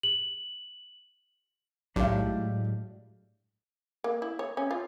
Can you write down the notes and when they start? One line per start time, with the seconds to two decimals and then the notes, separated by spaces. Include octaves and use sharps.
0.03 F#7
1.96 B1 A2 F#3 G#3 D4 G4 F5
4.04 A#3
4.22 E4
4.39 C#5
4.57 C#4
4.71 F4